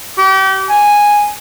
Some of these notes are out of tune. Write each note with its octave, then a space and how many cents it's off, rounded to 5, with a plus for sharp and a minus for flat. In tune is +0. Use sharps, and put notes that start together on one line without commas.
G4 -35
G#5 -5